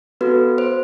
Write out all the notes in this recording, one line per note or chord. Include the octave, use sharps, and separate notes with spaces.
B3 F#4 A4 B4
C5